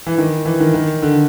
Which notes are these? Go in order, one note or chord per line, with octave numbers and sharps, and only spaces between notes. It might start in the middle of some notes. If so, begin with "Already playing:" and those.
E3
D#3
E3
D#3
D#3
D3